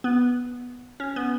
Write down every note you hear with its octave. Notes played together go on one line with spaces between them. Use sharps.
B3
C#4
B3